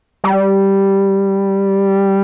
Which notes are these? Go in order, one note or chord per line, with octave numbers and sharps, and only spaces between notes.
G3